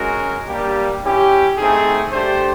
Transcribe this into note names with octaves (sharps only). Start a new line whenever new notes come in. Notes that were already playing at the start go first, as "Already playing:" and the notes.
Already playing: G#3 C#4 F#4 A#4
G3 A#3 D4 G4
C#4 E4 G4
A3 C4 D#4 G#4
A3 D4 G4 C5